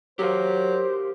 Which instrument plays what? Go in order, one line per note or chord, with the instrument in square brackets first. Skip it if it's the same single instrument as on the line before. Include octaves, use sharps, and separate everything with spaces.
[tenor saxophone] F#3 [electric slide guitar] G4 A#4 F5 [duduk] C5